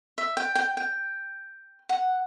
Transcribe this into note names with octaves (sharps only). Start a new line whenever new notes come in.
E5
G5
G5
G5
F#5